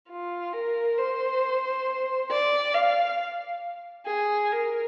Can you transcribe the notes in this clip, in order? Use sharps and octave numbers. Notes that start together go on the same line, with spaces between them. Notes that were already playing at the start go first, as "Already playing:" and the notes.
F4
A#4
C5
D5
F5
G#4
A#4